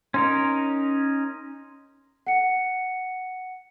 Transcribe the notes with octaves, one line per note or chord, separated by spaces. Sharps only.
C#4 D#4 A#4 C6
F#5 C#7